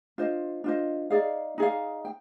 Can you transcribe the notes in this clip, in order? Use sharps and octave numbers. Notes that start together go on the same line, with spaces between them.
D4 F4 C5 D#5
D4 F4 C5 D#5
D#4 G#4 D5 F5
D#4 G#4 D5 F5
G5